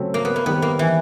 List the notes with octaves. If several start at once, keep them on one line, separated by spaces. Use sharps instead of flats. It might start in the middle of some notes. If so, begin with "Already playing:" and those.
Already playing: C#3 F#3 A3 C4
A#3
B3
A#3
D#3 G3 B3 C4
A#3
E3